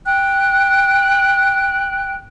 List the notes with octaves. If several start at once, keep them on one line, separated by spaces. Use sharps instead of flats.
G5 F#6